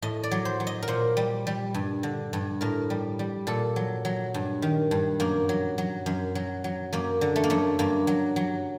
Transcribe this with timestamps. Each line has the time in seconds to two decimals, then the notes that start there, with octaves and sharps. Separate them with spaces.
0.02 A2 D#5
0.23 D5
0.31 F#3
0.45 C5
0.60 F#3
0.67 D#5
0.82 A#4
0.88 A#2 C5
1.17 G3
1.47 G3
1.74 G2
2.03 D3
2.33 G2
2.61 A2 A#4
2.90 G3
3.19 G3
3.47 A#2 A4
3.76 F#3
4.05 F#3
4.34 G2
4.62 D#3
4.91 G2
5.20 F#2 A#3
5.49 F#3
5.78 F#3
6.06 F#2
6.35 F#3
6.64 F#3
6.93 F#2 A#3
7.21 D3
7.36 A3
7.44 A#3
7.50 F#2 A3
7.79 G2 A#3
8.07 F#3
8.36 F#3